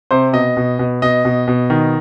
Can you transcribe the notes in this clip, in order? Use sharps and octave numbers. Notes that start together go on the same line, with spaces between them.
C3 C5
B2 D#5
B2
B2
B2 D#5
B2
B2
D#3